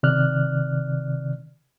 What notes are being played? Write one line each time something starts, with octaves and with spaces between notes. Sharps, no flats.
C3 D#3 D5 F6 F#6